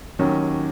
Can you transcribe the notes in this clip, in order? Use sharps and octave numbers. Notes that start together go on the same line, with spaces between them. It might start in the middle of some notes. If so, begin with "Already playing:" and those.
D#2 D#3 F#3 C#4